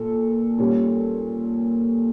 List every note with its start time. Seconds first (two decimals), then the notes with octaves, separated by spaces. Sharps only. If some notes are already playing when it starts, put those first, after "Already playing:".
Already playing: A#2 A4
0.58 A#2 G3 C#4